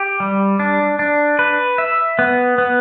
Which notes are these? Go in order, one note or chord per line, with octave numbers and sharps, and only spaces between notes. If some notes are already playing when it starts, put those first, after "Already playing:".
Already playing: G4
G3
D4
D4
B4
E5
B3
B3